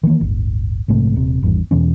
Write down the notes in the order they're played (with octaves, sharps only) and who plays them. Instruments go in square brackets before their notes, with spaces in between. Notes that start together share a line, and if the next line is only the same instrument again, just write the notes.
[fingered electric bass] D#3 E3 A#3
D1 G1
A#1 G#2 C3 A3
D#1 C3
G#1 E2 G2
E2 B2 E3 C#4